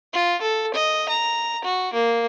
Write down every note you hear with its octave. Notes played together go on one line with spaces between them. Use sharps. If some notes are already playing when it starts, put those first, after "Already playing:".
F4
A4
D#5
A#5
F#4
A#3